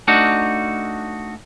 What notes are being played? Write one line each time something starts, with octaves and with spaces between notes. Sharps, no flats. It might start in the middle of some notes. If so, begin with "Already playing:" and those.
A3 D4 D#4 F#4